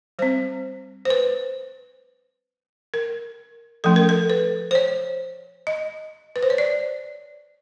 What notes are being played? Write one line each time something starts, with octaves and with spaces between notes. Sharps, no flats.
G3 C4 C5
C5
B4
A#4
F3 A3 C#4 A4
A#4
A4
B4
C5
C#5
D#5
B4
C5
C#5
D5